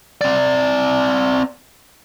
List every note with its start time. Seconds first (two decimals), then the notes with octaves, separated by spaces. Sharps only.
0.21 C4 D5